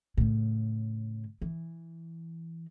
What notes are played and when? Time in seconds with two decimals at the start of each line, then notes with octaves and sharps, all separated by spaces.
0.17 A2 C#3
1.41 E3